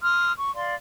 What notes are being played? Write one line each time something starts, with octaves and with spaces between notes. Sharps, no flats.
C6 D#6 F6
C#6
D5 F5 C6